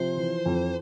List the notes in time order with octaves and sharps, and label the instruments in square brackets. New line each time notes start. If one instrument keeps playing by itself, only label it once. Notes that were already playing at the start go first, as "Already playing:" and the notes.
Already playing: [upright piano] C3 F3 [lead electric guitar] C5
[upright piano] E3
F2